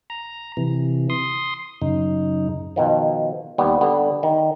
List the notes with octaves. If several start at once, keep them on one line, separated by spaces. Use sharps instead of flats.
A#5
C3 E3
C6 D#6
F#2 C#3 D#4
B2 D#3 F3
D#2 G3 B3
D3 G3 B3
D#3